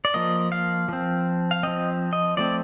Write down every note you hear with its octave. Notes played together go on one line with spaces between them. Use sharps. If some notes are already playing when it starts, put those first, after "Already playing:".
D5
F3 A#3 D#5
F5
F3 C4
F5
F3 C4 D#5
D#5
F3 A3 C4 D5